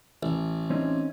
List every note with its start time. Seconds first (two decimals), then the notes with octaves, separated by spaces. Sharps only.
0.23 A1
0.70 C4 C#4 D#4